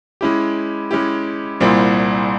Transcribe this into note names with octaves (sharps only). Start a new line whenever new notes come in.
G#3 C#4 E4 G4
G#3 C#4 E4 G4
C2 A#2 G3 C4 E4